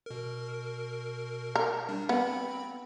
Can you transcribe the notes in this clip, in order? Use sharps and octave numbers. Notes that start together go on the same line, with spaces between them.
B2 A#4
A#4
G3 D4
B3 C4 B5